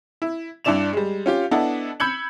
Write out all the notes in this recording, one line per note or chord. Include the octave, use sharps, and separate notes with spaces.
E4
G2 D4 E4 D5 E7 F7
G3 G#3
C#4 F4 G4
B3 D4 E4 A4 D#5
B5 E6 G6 G#6 C#7 F#7